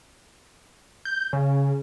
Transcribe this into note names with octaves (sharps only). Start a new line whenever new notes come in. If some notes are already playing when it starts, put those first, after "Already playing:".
G6
C#3